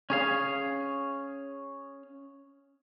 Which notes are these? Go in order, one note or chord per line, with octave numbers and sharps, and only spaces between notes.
C#4 G#4 F5